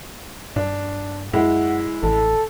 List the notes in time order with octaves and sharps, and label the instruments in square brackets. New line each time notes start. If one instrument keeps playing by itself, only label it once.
[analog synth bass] G2 [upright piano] D4
[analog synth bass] F#2 [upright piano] G#3 E4 [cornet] F#5
[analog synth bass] A1 [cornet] A4